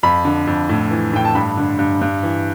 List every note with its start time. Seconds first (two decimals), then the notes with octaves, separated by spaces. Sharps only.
0.03 F2 B5
0.25 D3
0.47 F2
0.69 A2
0.91 E3
1.13 A2 G5
1.25 A5
1.35 G2 B5
1.57 D3
1.79 G2
2.01 G2
2.23 E3